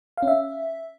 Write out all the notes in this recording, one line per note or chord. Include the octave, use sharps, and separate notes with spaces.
F5
C#4
E5